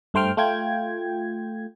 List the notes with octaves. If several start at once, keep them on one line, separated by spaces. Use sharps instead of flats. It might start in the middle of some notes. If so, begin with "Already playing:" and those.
G2 A3 C5 G5 F6
A3 F4 G5 G#6